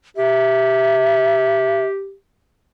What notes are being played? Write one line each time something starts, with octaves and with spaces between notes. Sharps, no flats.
G4 E5